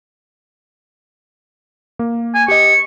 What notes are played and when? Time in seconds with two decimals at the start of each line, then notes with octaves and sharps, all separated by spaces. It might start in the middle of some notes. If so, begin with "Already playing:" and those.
1.99 A#3
2.35 G#5
2.48 G4 D#5 C#6